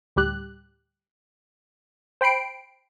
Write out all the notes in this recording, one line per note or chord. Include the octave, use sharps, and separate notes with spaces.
D2 A2 G3 G4 F#6
C5 G5 B5 C7 D7